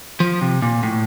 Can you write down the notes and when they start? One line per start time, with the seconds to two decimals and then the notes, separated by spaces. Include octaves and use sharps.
0.20 F3
0.41 C3
0.62 A#2
0.83 A2